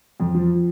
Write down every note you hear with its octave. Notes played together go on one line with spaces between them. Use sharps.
F2
F3